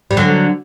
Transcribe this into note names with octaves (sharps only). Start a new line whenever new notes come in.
G3
D3 F#3